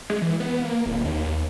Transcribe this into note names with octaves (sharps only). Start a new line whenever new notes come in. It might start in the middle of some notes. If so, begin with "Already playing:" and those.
G#3
E3
B3
A#3
D1
D#2
D#2